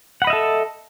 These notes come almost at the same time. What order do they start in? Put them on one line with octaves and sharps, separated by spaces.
F#5 B5 D#5 E5 A4